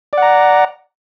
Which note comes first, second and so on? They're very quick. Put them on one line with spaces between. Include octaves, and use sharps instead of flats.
D5 F#5 A#5